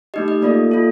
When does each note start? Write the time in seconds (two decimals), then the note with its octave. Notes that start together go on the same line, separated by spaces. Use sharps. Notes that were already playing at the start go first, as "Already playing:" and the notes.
0.14 A3 D#4 G4 D#5
0.28 D#5
0.42 A#3 F4 A4 D5
0.71 A#3 F4 A4